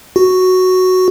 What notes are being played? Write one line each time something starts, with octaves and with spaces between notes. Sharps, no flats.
F#4